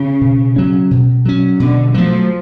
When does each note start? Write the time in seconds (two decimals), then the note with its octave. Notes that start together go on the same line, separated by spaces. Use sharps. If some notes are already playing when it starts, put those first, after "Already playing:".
Already playing: C#3
0.21 B2
0.56 F#3 C#4
0.91 B2
1.25 F#3 C#4
1.60 B2 D3
1.94 F3 F#3 A3